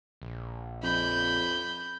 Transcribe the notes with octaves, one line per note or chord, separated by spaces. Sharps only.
A#1
F2 B5 G6